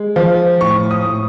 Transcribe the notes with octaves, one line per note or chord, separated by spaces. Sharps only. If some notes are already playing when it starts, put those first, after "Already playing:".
Already playing: G#3
F3
A2 C#6
D#6
A2